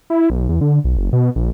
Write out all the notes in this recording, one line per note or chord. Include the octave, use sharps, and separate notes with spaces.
E4
B1
E2
D3
B1
F#1
B2
A#1